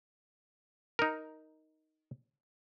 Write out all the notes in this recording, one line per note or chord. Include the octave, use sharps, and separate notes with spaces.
D#4 A#4